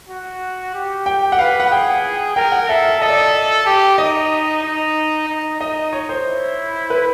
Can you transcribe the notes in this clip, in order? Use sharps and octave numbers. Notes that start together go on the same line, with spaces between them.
F#4
G4
G5
F#5
B4 F5
F#5
G#4 G5
A#4 G5
F#5
A4 E5
E5
A4 D#5
D5
D#5
G4
D#4 D#5
D#4
D#4
D#4 D#5
C#5
C5
E4
B4